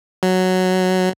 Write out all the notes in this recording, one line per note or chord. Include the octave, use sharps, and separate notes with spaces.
F#3